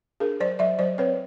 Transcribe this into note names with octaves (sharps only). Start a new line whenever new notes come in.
D4 G#4 A#4
F#3 C5 D5
F#3 D5 E5
F#3 C5 D5
C4 B4 C#5